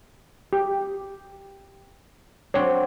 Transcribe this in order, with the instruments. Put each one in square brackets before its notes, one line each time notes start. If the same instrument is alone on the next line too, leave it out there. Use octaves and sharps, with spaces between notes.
[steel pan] G4
[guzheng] F#3 C4 D4 [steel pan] C#5